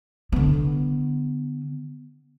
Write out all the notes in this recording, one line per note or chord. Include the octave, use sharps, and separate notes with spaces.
D3 B3